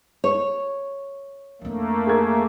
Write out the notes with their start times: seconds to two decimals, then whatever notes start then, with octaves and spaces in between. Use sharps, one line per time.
0.24 C#5
1.62 F2 A3 A#3 D4
2.07 G#4 A#4 G#6